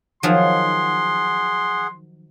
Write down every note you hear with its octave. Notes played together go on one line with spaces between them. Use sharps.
D#3 F3 F#3 G#4 F#5 C6